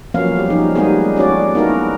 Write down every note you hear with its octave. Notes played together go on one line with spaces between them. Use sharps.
F3 F#3 A#3 B3 C#4 F5
G3 G4
F3 D#4 G#4
G3 G#3 A#3 B3 D#4 G#4
C#4 D4 F#4 D5
A#3 B3 D#4 E4 F#4 A#4